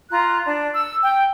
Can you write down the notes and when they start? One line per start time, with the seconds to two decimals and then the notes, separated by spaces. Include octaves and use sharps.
0.10 F4 A#5 F#6
0.46 D4 D5
0.74 E6
1.04 G5